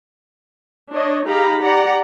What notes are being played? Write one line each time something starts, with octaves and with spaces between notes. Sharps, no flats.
D4 C#5 D#5
D#4 G4 G#4 F5 A#5 B5
G4 D5 F#5 A#5